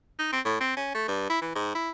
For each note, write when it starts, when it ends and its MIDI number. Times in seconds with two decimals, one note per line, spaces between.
0.19 0.29 63
0.32 0.40 60
0.45 0.58 45
0.60 0.75 60
0.76 0.94 61
0.94 1.05 57
1.08 1.25 43
1.29 1.38 64
1.41 1.53 52
1.55 1.74 44
1.75 1.90 64